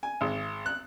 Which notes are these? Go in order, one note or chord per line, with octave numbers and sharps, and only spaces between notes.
G#5
G#1
F#6